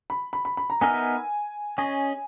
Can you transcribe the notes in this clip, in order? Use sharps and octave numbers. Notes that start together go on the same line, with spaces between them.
B5
B5
B5
B5
A#5
B3 D#4 A#4 E5 G#5
C#4 G#4 D#5 G#5